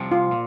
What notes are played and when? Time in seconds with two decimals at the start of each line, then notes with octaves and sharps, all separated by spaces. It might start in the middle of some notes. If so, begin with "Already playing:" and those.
Already playing: C2 C3 F3
0.12 F4
0.31 A#2